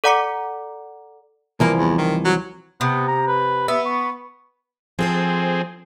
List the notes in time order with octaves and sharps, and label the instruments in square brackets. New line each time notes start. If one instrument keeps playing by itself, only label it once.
[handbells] A4 D5 F#5 A#5 D6 C#7
[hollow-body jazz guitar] C2 E3 F3 [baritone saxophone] A#3
[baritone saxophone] E2
D#3
F#3
[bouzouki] C3 [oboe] B3
[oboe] A#5
B4
[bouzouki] B3 [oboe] E5
[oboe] C#6
[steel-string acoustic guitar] F3 A4 C5 [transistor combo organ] C4 G#4